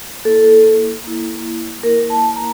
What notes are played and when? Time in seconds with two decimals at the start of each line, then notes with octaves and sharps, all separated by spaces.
0.25 A#3 E4 A4
1.04 A#3 E4
1.83 A#3 E4 A#4
2.10 A5
2.36 A#5